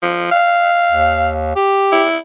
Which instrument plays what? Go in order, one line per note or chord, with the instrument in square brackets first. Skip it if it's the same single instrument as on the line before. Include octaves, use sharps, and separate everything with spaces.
[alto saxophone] F3
F5
[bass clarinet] D#2
G4
[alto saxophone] E4